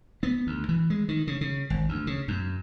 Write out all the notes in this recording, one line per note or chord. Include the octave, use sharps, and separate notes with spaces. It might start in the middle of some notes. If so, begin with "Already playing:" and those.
B3
D2
E3
G#3
D#3
C#3
C#3
G#1
D2
C#3
F#2